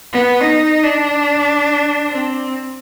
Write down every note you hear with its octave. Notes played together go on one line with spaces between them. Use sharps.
B3
D#4
D4
C4